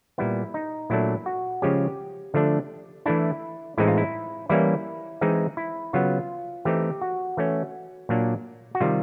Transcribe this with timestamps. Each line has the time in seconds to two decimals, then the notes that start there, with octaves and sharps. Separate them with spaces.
0.18 A#2 G3 B3 E4
0.54 D#4
0.90 A#2 F#3 A3 D4 E4
1.26 F#4
1.62 C#3 F3 G#3 C#4 G4
2.34 D3 F3 A3 D4
3.06 E3 A3 D4 E4
3.78 A2 E3 G#3 C4 D#4 E4
3.87 F4
3.98 E4
4.49 E3 G3 A#3 C#4 E4
5.21 E3 G#3 C4 D#4
5.57 E4
5.93 C#3 F#3 B3 F4
6.65 E3 A3 C4 D#4 G4
7.02 F#4
7.37 E3 A3 C#4
8.09 A#2 F#3 A#3 D4
8.75 F#4
8.81 C3 D#3 G3 F4